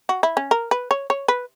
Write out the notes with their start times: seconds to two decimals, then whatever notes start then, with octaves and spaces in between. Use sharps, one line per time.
0.09 F#4
0.23 E4
0.37 C#4
0.51 A#4
0.71 B4
0.91 C#5
1.10 C#5
1.28 B4